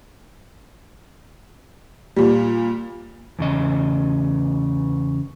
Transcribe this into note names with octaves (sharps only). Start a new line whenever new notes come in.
A#2 G3
E2 C#3 D#5